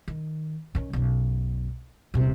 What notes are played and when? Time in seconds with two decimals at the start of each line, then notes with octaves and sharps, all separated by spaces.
0.08 D#3
0.75 D#3 C#4
0.93 B1 F#2
2.14 D#1 C3